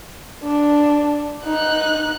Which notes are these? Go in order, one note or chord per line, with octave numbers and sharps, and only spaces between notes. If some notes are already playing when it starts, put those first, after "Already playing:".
D4
D#4 F#6